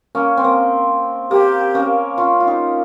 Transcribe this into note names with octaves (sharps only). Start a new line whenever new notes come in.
A#3 C#4
C4
A#3
A#3 G4
A#3 C#4
C#4 F4
F4
D#4 G4